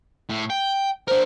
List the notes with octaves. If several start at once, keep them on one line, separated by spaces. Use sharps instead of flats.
A2
G5
D4 A#4 C5